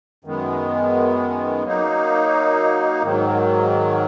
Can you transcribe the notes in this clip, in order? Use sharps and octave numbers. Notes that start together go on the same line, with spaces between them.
F#2 D#3 G#3 B3
F#3 A#3 D#4
G#2 D#3 F#3